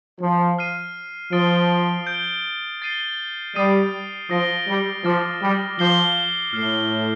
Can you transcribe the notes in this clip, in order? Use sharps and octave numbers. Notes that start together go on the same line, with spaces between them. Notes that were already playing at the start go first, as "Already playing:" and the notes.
F3
F6 C7 D#7
F3 D#6 A6 D7 G7
G6 D7 G7
A6 C7 D#7 G7
G3 D#6 A6 C7 D#7
F3 D#6 A#6 D7 G7
G3
F3 D6 F6 A6
G3
F3 D6 G6 C7 G7
A2 F6 C7 G7